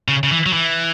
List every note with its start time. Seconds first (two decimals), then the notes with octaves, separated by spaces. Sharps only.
0.08 C#3
0.23 C#3
0.31 E3
0.46 F#3
0.53 E3